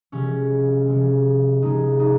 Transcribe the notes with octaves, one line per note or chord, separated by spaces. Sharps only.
C3 F3 G#3 C#4
C3 F3 G#3
C3 F3 G#3 D#4
D#4